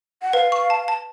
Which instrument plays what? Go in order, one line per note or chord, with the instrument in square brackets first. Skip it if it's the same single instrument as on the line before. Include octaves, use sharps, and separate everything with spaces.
[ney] F#5
[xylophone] B4 [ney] F5
[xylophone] C#6
A5
A5